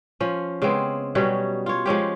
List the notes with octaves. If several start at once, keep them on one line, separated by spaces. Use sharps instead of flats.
F3 C#4
C#3 G#3 B3 C4
B2 F#3 G3 C#4
F4 C#5
F3 G#3 C#4 G4